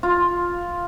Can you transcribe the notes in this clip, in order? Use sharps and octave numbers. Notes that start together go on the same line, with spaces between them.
F4